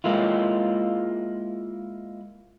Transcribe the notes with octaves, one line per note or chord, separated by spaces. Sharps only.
G#3 A#3 E4 F4